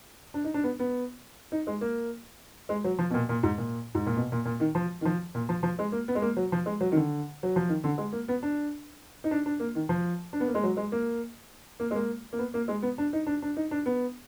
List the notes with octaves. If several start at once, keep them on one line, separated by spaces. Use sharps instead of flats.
D4
D#4
D4
B3
B3
D#4
G#3
A#3
G#3
F#3
F3
B2
A#2
A#2
G#2
A#2
G#2
A#2
B2
A#2
A#2
D#3
F3
D#3
F3
A#2
F3
F3
G#3
A#3
B3
G#3
A#3
F#3
F3
G#3
F#3
D#3
D3
F#3
F3
D#3
D3
G#3
A#3
B3
D4
D#4
D4
D4
A#3
D#3
F3
D4
B3
A#3
G#3
F#3
G#3
A#3
A#3
G#3
A#3
A#3
B3
A#3
G#3
B3
D4
D#4
D4
D4
D#4
D4
B3